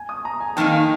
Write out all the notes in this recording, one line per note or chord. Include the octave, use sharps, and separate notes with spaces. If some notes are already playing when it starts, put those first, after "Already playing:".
Already playing: G#5
D#6
A#5
G#5
F2 D#3 A#3 D#4 G5
F5